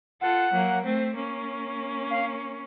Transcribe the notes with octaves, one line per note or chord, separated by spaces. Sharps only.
F4 A4 F#5
F#3 A#3
A3 C4
A#3 C#4
F5